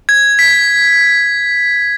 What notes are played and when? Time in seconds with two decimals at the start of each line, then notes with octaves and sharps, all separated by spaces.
0.09 G#6
0.39 B6